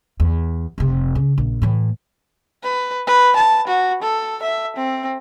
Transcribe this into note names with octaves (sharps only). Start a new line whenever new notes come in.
E2
F1 C3
C#3
A#1
A2 E3
B4
B4
A5
F#4
A4
E5
C4